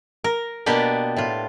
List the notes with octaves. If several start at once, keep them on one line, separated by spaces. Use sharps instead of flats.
A#4
B2 A#3 B3 D4 G4 D5
A2 F4